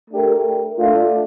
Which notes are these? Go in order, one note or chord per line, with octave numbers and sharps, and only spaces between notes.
A3 D4 G4 A#4
A3 D4 F4